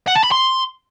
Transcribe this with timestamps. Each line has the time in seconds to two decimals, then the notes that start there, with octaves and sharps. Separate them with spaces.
0.07 F#5
0.15 A5
0.23 B5
0.31 C6